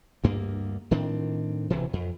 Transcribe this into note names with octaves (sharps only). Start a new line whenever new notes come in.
D2 G2 A#3
A2 D#3 C4 D4
E1 D2 C3 E3
F2